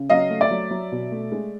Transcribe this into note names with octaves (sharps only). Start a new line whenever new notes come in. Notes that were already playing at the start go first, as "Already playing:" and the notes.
Already playing: C#3
F#3 D#5 F5
A3
D5 E5
F#3
F#3
B2
A3
G#3